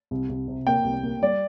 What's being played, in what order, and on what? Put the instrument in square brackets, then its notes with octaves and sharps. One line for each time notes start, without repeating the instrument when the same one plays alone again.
[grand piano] C2
C2
C3
[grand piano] A#3 [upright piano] G5
[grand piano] C2
A#3
[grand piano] G3 [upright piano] D5